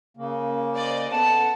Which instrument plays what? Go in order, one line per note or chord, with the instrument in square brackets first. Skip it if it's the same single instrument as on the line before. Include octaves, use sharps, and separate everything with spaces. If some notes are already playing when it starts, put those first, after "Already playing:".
[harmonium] C#3 A#3
[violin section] C5 D5 D#5
[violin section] B3 A4 F#5 [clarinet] A5